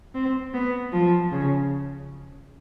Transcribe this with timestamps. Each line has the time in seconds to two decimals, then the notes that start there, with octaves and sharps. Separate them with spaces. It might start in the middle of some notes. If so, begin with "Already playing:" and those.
0.15 C4
0.54 B3
0.92 F3
1.32 C#3